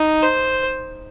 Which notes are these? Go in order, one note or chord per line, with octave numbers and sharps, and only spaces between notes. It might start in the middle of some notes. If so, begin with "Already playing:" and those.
Already playing: D#4
C5